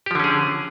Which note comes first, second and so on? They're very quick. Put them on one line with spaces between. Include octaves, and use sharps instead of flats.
G4 F3 D3 C#4 G#4